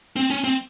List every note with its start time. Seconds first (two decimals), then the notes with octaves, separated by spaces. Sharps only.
0.16 C4
0.30 C#4
0.44 C4